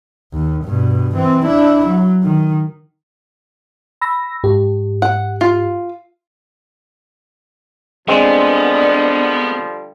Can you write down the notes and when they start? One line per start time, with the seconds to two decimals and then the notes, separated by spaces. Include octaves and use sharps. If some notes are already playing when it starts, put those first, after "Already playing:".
0.33 D#2
0.65 G2 B2
1.16 E3 C4
1.45 D4 E4
1.86 F#3
2.23 D#3
4.01 B5 E6 A#6
4.44 G#2 G4
5.02 F#5
5.41 F4
8.08 D3 F3 G3 G#3 B3 C4 D4